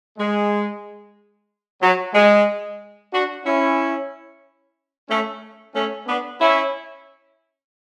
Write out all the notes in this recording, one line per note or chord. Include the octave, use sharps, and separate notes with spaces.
G#3
F#3
G#3
D4 F#4
C#4 E4
A3 C#4
A3 C#4
B3 D4
C#4 E4